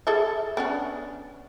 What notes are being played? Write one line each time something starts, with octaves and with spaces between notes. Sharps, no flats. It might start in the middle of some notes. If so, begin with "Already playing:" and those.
G#4 A4 E5
B3 C#4 D4